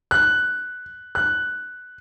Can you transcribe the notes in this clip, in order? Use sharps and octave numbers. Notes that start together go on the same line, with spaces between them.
F#6
F#6